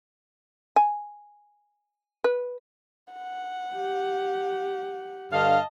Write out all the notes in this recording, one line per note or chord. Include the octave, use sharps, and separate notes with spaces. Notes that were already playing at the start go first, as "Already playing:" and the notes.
G#5
B4
F#5
G4
G2 D3 D#5 F5 A5